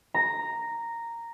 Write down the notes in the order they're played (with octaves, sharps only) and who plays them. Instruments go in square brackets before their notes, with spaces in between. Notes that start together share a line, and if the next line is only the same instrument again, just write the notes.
[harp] A#5